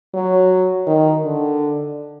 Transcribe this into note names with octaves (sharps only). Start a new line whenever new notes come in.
F#3
D#3
D3